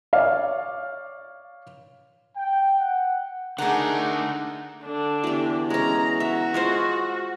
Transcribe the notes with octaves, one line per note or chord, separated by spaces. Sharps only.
C#5 D5 F5
G5
F#5
D3 A3 D4 D#4 G#4 A#4 F#5
D3 D4
E2 F#4 G4
G#3 C#4 A#5
F#4 E5
G#3 F4 C5